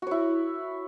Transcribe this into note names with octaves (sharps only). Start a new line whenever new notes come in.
E4 F#4 C#5